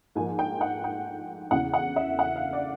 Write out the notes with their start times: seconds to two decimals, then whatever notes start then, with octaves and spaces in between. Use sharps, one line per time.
0.16 G#2 F3 A#3 G#5
0.39 G5
0.61 F#5
0.84 G5
1.51 E2 C#3 E3 F#5
1.74 F#5
1.96 E5
2.19 F#5
2.36 F5
2.53 D5